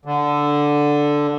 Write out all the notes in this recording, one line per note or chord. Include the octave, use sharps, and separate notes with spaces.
D3